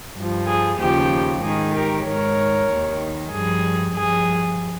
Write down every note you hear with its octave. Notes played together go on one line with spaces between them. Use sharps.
G2 F3
G#4
D#2 C#3 F3 G4
G#2 D#3 G#4
G4 A#4
G#2 D#3 A#4 C#5
D#2 D#3
G2 F3 G#4
G2 F3 G#4